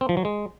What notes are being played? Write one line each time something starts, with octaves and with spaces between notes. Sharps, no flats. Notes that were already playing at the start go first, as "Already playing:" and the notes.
C4
F3
F#3
G#3